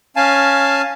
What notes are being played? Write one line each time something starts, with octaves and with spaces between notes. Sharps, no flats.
C#4 F5 G#5 A5